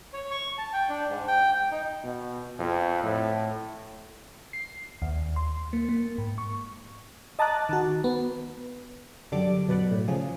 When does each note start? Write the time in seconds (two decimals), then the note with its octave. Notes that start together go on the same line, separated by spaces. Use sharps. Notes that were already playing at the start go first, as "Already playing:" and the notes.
0.13 C#5
0.31 C#6
0.58 A5
0.73 G5
0.89 D4
1.09 G#2
1.28 G5
1.55 G5
1.71 D#4
2.03 B2
2.59 F2
3.03 A2
4.53 C7
5.02 D#2
5.36 C6
5.73 A#3
5.89 A#3
6.18 G#2
6.38 C#6
7.39 D#5 A5 A#5 D6 F#6 A6
7.69 D#3 F#4
8.04 B3
9.32 F#2 D3 G3 A4 D5 D6
9.68 F#2 B2 B4 D5 F#5
9.91 A2
10.08 C#3 F3 G#4